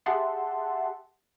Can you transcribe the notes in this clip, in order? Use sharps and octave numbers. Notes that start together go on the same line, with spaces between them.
G4 G#4 E5 F#5 A5 C6